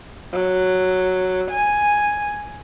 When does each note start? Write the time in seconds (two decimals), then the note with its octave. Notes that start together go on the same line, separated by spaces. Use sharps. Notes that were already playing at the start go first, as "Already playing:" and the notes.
0.33 F#3
1.50 G#5